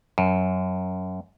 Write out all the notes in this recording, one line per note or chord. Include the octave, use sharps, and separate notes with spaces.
F#2